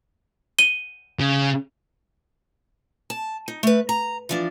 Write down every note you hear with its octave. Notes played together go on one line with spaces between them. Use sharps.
D#7 G7
C#3
A5
D#4
A3 B4
A#5
E3 F3 D4